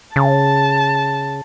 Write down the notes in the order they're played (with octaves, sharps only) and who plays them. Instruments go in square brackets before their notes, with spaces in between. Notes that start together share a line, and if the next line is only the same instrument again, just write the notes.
[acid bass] C#3 [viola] A5